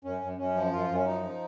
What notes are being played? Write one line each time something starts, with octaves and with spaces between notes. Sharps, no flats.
F#2 C#4
F#2
F#2 C#4
F3
F#2 F4
F#2
C#4
F3 D#4
F3